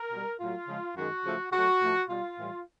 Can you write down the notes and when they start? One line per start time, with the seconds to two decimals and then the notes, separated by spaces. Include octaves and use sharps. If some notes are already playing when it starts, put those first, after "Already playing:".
Already playing: A#4
0.12 B2 G3
0.40 A2 F#3 A3 F4
0.68 C#3 F3 G#3
0.96 F#2 D#3 G#3 F#4
1.24 C#3 F3 A3
1.52 C#3 F#3 A3 F#4
1.81 A2 F3 A3
2.09 B2 G3 F4
2.38 A2 E3 G3